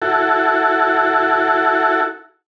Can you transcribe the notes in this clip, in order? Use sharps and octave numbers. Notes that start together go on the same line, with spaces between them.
E4 F#4 A4